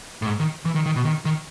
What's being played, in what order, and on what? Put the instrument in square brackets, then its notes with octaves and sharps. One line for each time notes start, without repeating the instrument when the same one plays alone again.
[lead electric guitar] A2
G#2
D#3
E3
D#3
D#3
B2
D#3
D#3